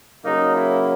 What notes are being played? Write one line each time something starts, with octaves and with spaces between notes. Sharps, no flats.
C#3 F#3 A#3 D#4
E4